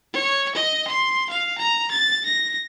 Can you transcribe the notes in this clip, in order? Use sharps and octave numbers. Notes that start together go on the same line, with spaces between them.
C#5
D#5
C6
F5
A#5
A6
A#6